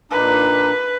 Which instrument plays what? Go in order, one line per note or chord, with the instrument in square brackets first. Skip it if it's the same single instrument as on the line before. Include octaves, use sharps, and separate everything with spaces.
[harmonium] A#2 D4 D#4 [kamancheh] B4